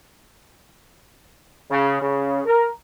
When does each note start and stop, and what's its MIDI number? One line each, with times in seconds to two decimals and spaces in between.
1.69 1.98 49
2.00 2.40 49
2.45 2.67 70